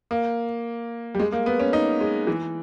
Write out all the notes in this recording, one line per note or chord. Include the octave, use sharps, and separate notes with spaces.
A#3
G3
G#3
A#3
B3
C#4
D#4
G#3
E3